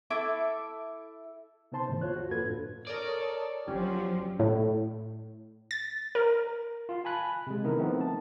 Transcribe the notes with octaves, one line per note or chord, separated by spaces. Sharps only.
E4 A4 E5 D6
C3 B3 D#4 C5 A5 C6
G#2 D3 E3 G#3 A#3 C5
D2 F4 C5 C#5 F#6
F#4
F2 A#3 F4 A4 B4 G#6
F#2 A2 D4
A4 A#4 C#5 D5 D#6
G1 F3 F#3 C#4 G4
A2
A6
A#4
F4 F5 C6
G#5 A5 B5 F#6
C3 G#3
D3 D#3 B3 D#4 E4 A#4
F3 A3 B3 C4 D#4
A5